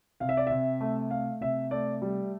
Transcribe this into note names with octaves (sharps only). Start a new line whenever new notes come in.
C3 F5
E5
D5
C3 E5
A3
A3 F5
C3 E5
A3 D5
G3